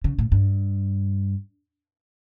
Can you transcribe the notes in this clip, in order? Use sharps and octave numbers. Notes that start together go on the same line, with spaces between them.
C#3
A2
G2